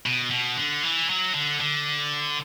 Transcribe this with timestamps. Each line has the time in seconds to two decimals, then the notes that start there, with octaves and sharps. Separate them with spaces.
0.06 B2
0.31 B2
0.57 D3
0.83 E3
1.09 F#3
1.34 D3
1.60 D3